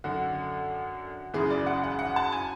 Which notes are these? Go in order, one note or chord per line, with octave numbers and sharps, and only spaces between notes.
F#2 D3 F#4
F#2 C#3 E3 G#4
D5
F#5
F#5
F#5
A5
G#5